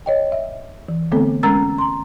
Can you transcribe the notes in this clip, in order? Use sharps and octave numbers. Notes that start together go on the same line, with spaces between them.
C#5 D#5 G5
E5
E3
D3 A3 B3 C4 A4
G#3 C#4 A#4 A#5 E6 A6
A#5 C6